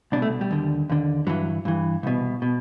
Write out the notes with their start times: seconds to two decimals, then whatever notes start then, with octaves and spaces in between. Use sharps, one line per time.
0.12 C2 B2 D4
0.22 A3
0.41 G3
0.51 D#2 D3
0.89 D#2 D3
1.27 G2 E3 F#3
1.65 G2 E3
2.03 C2 B2
2.42 B2